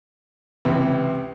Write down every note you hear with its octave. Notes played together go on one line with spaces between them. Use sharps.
C#2 C3 E3